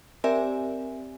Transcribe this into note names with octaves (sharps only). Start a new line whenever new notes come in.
C4 G4 A#4 D5 E5 G#5